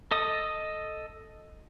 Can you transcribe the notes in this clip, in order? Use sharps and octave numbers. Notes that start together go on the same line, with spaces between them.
A4 D#5 D#6